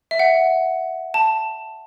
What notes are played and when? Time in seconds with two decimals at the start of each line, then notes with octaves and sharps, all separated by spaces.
0.11 E5
0.19 F#5
1.14 A5